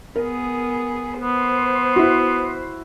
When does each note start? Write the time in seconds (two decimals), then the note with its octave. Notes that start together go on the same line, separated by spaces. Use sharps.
0.16 B3 G#4 A#4
1.21 B3 C5
1.96 E4 F#4